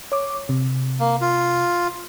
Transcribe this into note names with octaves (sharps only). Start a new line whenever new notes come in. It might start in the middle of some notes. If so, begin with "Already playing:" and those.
C#5 D6
C3
A#3
F4